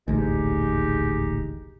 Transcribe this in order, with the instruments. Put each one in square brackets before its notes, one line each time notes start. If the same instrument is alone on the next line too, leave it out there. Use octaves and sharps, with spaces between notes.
[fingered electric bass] D#1 A1 D2 [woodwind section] G#3 D#4 G4